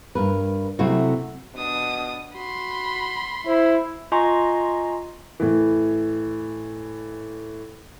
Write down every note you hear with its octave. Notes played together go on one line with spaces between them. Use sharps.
G2 A#4 B4
C3 F#3 A3 C4 E4 F#4
B2 D4 D#6
F#4 B5 C6
E4 C5
F4 D#5 G#5 A#5 C6 C#6
A2 E3